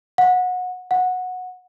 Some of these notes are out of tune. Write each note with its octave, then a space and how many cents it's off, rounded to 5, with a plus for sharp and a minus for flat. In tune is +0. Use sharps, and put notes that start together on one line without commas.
F#5 -25
F#5 -15